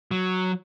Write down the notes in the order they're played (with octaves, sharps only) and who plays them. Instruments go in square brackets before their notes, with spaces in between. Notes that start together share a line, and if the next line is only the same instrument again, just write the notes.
[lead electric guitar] F#3